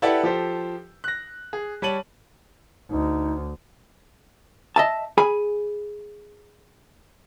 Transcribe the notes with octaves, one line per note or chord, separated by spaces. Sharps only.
E4 G4 A4 B4 D5 F#5
F3 G4 A4 C5
F#6 A#6
G#4
G3 C#5 A5 D#7 F#7
D2 D#4
D#5 E5 A5
G#4 G#5 B5